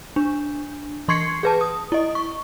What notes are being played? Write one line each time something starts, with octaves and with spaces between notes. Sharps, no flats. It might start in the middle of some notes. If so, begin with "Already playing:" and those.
D4
E3 C6 C#6 G#6 C7 C#7
G#4 B4 A5
D#6
E4 D#5
C#6